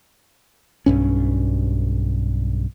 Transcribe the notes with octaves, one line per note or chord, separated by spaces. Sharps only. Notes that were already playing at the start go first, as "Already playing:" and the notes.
B1 G2 C#4